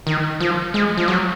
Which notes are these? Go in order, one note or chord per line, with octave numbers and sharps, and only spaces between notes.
D#3
F3
G#3
F3
F#3